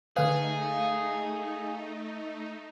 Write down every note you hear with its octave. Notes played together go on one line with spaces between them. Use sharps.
D3 A3 D#4 G#4 B4 F5